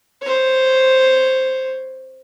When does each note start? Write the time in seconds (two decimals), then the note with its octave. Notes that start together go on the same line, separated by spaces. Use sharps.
0.22 C5 C#5